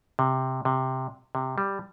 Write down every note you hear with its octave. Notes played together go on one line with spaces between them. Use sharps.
C3
C3
C3
G3